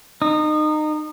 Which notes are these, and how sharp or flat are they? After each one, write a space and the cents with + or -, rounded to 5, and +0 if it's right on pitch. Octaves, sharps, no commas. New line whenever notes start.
D#4 -25